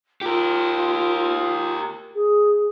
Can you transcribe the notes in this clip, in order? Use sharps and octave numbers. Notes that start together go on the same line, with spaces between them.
F4 G4 A#4
G#4